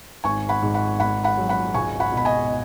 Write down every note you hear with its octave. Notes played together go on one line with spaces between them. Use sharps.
G#1 G#5 C#6
F#5 B5
G#2
F#5 B5
G#1 F#5 B5
F#5 B5
F#3
F#5 B5
C#2 G#5 C#6
F#5 B5
B2
B5
D#5 G#5